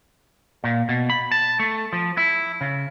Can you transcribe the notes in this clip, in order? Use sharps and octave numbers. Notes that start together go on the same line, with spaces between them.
A#2
B2
B5
A5
A3
F3
E4
C#3